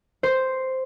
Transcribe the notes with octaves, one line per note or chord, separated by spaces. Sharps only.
C5